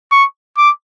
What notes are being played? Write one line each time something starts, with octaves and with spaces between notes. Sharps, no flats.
C#6
D6